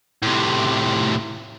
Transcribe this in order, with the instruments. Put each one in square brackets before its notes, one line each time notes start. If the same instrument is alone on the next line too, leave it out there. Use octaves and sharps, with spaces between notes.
[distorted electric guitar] A2 C3